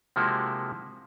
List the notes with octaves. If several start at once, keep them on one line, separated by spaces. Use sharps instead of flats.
C3 F3 G#3 A#3 E4 F#4